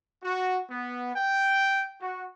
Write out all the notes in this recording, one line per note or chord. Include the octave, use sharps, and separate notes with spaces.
F#4
B3
G5
F#4